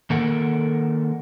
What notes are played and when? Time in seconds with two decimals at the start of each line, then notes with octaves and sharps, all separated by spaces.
0.10 D#3 A#3 A4 A#4 F#5